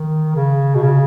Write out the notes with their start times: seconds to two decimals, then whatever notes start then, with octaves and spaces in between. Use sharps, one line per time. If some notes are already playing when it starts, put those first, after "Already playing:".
Already playing: D#3
0.35 C#3
0.75 B2
0.83 C#3